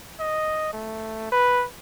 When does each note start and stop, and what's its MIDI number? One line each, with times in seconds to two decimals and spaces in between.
0.19 0.71 75
0.73 1.31 57
1.32 1.65 71